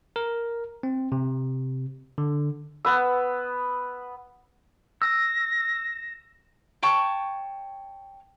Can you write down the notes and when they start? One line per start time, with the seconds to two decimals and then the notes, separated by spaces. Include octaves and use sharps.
0.16 A#4
0.83 C4
1.12 C3
2.18 D3
2.85 B3 B4 E6
5.02 E6 A#6
6.82 C#5 G5 A5 C#6